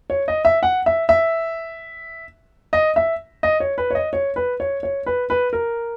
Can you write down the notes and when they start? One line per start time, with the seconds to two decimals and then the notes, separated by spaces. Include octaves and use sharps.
0.10 C#5
0.28 D#5
0.45 E5
0.63 F#5
0.86 E5
1.09 E5
2.73 D#5
2.96 E5
3.43 D#5
3.60 C#5
3.78 B4
3.90 C#5
3.95 D#5
4.13 C#5
4.36 B4
4.60 C#5
4.83 C#5
5.06 B4
5.30 B4
5.53 A#4